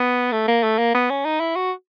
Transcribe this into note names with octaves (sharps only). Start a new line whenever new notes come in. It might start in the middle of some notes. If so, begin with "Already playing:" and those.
Already playing: B3
A3
A#3
A3
A#3
B3
C#4
D#4
E4
F#4